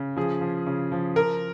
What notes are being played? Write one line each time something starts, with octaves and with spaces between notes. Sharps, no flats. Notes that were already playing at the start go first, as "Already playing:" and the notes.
Already playing: C#3
F3 G#4
F3
C#3
F3
F3 A#4